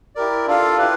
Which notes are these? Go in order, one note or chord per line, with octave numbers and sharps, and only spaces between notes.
E4 G4 A#4 D5
D4 F4 A4 D5 F5
E4 G4 B4